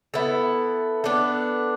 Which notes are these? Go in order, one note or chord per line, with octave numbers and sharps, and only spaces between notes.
B3 E4 A4
B3 D4 A4